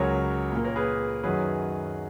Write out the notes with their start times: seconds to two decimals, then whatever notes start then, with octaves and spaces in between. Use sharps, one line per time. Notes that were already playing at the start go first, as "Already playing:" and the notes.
Already playing: C#2 C#3 F#3 A#4 C#5
0.52 A#2
0.57 A#3
0.64 A#4 C#5
0.76 G#4 B4
1.24 F#2 D#3 F#3 G#4 B4